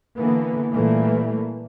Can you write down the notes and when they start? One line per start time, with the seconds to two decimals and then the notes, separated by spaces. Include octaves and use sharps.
0.16 D3 E3 A#3 B3
0.71 A#2 E3 G3 A3 A#3